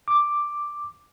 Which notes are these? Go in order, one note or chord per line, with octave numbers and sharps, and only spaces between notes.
D6